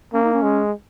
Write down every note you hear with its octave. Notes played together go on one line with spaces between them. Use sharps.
A#3 C#4
D#4
C#4
G#3